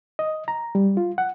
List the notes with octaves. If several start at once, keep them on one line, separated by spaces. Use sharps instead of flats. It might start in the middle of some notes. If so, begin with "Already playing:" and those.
D#5
A#5
G3
F4
F#5